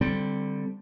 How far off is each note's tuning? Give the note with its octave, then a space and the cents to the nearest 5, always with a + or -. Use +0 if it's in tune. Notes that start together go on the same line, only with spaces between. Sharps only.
D3 +0 G3 +0 C4 +0